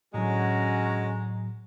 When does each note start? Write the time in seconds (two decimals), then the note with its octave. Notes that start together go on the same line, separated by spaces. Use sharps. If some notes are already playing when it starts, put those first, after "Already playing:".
0.14 A2 D3 F#3 G#3 C#4 F#4 A#5